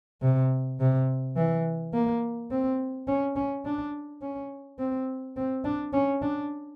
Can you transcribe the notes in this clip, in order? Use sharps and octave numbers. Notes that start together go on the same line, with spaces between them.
C3
C3
E3
A#3
C4
C#4
C#4
D4
C#4
C4
C4
D4
C#4
D4